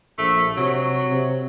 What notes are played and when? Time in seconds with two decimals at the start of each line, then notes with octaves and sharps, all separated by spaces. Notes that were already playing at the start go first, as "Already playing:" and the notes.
0.18 A#1 A3
0.57 C3 F#3
1.09 C3